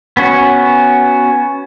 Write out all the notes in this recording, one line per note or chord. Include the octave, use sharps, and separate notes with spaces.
B3 C#4 F#4